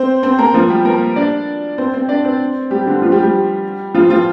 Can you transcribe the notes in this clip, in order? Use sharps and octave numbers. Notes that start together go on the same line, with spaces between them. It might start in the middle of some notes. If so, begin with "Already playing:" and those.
Already playing: C4 C5
C4 C5
A#3 A#4
F3 F4
G3 G4
A#3 A#4
D4 D5
C4 C5
C4 C5
D4 D5
C4 C5
G3 G4
D3 D4
F3 F4
G3 G4
G3 G4
F3 F4
F3 F4